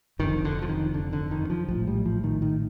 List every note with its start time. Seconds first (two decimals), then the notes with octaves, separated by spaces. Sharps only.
0.19 F1 F2 D3 D#3
0.45 D3
0.62 F3
0.69 D#3
0.94 D3
1.13 D3
1.31 D#3
1.50 F3
1.68 A#1 A2 F3
1.87 G3
2.05 F3
2.24 D#3
2.42 D#3